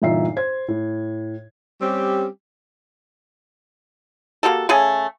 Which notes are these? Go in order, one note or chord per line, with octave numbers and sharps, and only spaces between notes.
G1 E2 A#2 D#4 E5 C7
C5 G#6
A2
G3 C4 C#4 G4
A#3 F#4 G4 A4
C#3 A3 G#4 G#5